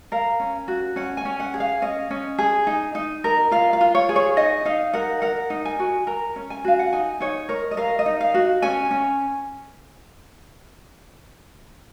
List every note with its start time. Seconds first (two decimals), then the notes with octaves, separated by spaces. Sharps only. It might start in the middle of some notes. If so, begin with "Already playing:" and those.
0.12 A#4 F5
0.40 C#4
0.68 F#4
0.96 C#4 F#5
1.17 G#5
1.25 C#4
1.40 F#5
1.54 G#4
1.60 F5
1.82 C#4 D#5
2.11 C#4
2.38 G#4
2.67 D#4
2.95 D#4
3.24 A#4
3.51 F4 F5
3.73 F5
3.81 F4
3.95 C#5
4.09 G#4
4.16 C#5
4.37 D#4 D#5
4.65 D#4 F5
4.93 A#4 F#5
5.22 A#4 F#5
5.50 D#4
5.65 G#5
5.79 F#4
6.07 A#4 A#5
6.36 C#4
6.50 G#5
6.64 F#4 F5
6.79 F#5
6.93 D#4 G#5
7.20 D#4 C#5
7.49 A#4 C#5
7.71 D#5
7.77 A#4 F5
7.99 D#5
8.06 D#4
8.21 F5
8.34 F#4
8.62 C#4 G#5
8.91 C#4